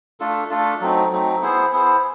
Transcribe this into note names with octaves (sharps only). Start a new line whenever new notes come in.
A3 D4 F4 A4
A3 D4 F4 A4
F#3 A3 C4 D#4
F#3 A3 C4 D#4
B3 E4 G#4 C5
B3 E4 G#4 C5